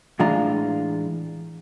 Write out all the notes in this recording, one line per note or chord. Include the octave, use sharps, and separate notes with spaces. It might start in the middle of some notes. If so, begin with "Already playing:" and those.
A2 E3 G#3 D4 F4 A#5